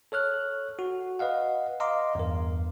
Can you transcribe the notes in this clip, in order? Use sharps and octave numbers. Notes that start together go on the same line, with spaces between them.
A4 C#5 F6 F#6
F#4
B4 D#5 F5 F#5
D#5 F5 A#5 C6 D6
E2 G2 A#4